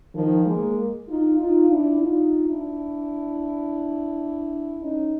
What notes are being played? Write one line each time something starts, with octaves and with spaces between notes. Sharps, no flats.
D#3 F3
G#3 A#3
D#4 F4
D#4 F4
D4 E4
D#4 F4
D4 E4
C#4 D#4